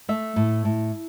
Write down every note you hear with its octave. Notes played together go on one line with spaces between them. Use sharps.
A3 E5
A2
A2